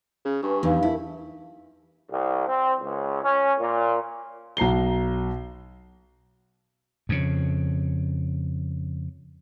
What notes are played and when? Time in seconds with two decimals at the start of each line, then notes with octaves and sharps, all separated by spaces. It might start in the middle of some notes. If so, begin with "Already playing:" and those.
0.25 C#3
0.43 G2 B4 G#5 C#6
0.63 E2 D#4 F5
0.83 E4 A#4 E5 A5
2.11 C2
2.47 C4
2.81 C#2
3.23 C#4
3.60 A#2
4.57 B1 A#5 C7 G7
7.09 F2 C#3